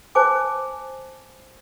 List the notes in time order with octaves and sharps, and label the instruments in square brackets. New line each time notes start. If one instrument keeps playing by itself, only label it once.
[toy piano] C5 G#5 A5 D6